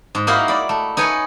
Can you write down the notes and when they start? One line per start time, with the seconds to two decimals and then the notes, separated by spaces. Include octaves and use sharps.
0.15 G#2
0.27 A#3 D#4 E4 F#4 F5
0.48 D5 B5
0.69 A3
0.97 D#4 B4 C#5 G#5